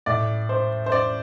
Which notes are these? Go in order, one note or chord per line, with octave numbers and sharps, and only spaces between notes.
A2 D5
C5
C5
D5